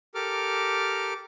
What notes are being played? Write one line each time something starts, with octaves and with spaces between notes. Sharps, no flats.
G4 A4 A#4 D6 F6